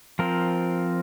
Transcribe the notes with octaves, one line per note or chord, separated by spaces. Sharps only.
F3 C4 F4 A#4